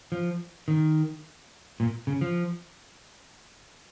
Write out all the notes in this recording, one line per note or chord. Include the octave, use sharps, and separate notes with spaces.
F3
D#3
A#2
C#3
F3